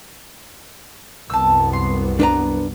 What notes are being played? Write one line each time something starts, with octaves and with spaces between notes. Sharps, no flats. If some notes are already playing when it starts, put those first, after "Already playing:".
C2 F#2 B3 A5 E6
C6
D4 B4 A#5